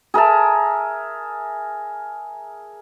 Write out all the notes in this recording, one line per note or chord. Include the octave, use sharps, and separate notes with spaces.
G#4 A#4 E5 A5